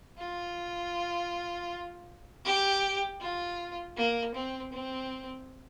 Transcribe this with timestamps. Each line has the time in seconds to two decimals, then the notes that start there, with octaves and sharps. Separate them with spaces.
0.18 F4
2.45 G4
3.21 F4
3.97 A#3
4.34 C4
4.72 C4